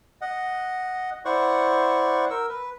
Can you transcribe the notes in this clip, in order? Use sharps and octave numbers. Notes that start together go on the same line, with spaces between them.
D#5 F#5
E4 C5 D5 F#5 C#6
A#4 E6
B4